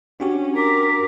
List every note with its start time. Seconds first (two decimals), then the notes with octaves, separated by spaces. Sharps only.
0.20 C#4 D4 F#4 G4
0.57 A#4 D6 B6